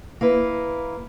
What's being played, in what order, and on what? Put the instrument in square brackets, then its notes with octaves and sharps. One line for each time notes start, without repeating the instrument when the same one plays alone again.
[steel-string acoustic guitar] A#3 E4 B4